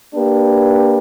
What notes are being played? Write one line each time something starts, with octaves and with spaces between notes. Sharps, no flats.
A#3 D4 G4 B4